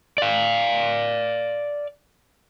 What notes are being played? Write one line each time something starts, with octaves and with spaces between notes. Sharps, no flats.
D5 F5